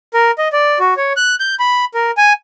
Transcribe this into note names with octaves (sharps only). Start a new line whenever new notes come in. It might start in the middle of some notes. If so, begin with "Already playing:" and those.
A#4
D#5
D5
F#4
C#5
F#6
G6
B5
A#4
G#5